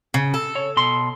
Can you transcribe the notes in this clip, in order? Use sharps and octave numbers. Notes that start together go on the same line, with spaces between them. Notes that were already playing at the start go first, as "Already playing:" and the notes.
C#3
A4
C#5
B2 C6